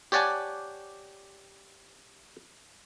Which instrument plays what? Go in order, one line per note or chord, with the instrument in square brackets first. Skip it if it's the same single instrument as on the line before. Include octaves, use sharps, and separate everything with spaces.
[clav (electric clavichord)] G4 C#5 D5 F#5 G#5 A5